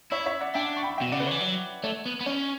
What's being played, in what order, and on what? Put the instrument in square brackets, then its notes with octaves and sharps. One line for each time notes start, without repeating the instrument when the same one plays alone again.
[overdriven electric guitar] E4 [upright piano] C#5 E5
[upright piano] C#5 E5
D5 F#5
[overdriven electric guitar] D4 [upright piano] E5 G5
[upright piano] C#6
G5 B5
[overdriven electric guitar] B2 [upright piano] E5 G5
[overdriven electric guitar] C#3 [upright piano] D5 F#5
[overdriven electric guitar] D3 [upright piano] B4
[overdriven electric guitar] E3 [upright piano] C#5
[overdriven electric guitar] F#3
[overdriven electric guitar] A3 [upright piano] C#5
[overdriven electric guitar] B3
B3
[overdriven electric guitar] C#4 [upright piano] C#5